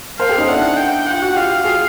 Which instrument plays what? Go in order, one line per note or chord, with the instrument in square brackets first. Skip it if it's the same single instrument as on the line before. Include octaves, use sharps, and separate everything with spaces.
[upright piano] A#4 C5 [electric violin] F5
[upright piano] G4 A4
C#4 D#4
[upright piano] D4 E4 [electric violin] F#5
[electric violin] G5
[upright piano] F4 [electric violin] F#5
[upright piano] F#4
[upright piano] F4 G4 [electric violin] F5
[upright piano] F#4 G#4